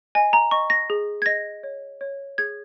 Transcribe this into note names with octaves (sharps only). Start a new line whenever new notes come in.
D#5 G#5
A#5
D#5 C#6
A#6
G#4
G#6
D#5 A#6
C#5
C#5
G#4 G#6